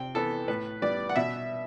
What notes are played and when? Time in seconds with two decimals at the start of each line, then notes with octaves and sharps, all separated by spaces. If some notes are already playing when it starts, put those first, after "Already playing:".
Already playing: C3 G5
0.15 E3 B3 A4
0.48 A2 B4
0.82 G3 B3 D5
1.09 F#5
1.16 B2 E5